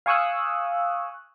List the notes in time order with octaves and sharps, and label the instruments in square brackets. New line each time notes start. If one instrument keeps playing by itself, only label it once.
[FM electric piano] F5 G#5 C#6 D#6 E6 F#6